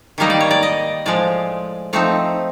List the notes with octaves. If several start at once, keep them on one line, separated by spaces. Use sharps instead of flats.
D#3 G3 A#3 D#4 D#5
D5
C#5
D5
D#5
A2 F3 G#3 D5
F3 A3 C4 D#4